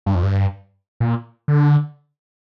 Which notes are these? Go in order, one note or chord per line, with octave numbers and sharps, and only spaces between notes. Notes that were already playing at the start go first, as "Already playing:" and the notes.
G2
F2
G2
A#2
D3